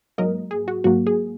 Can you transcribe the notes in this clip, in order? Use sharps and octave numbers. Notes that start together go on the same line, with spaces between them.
G#2 F#3 A#3 A#4 D#5
G#4
F#4
G#2 F#3 A#3 F#4
G#4